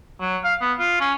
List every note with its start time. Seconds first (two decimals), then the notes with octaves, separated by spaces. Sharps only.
0.21 F#3
0.44 F5
0.61 B3
0.79 F4
1.00 C#4